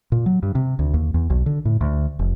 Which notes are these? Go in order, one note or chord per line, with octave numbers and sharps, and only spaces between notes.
A#2
F#3
G2
C3
D2
D#2
E2
B1
D3
A2
D2
F1